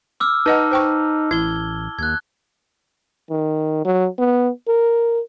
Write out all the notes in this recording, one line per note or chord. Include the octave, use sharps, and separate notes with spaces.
D6 E6 F6
D#4 B4 D#5 F#5 A5 F6
C5 G5 C#6
A1 E4 G#6 G7
D#2 F#6 G#6
D#3
F#3
B3
A#4